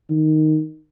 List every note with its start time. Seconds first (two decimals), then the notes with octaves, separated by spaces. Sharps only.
0.10 D#3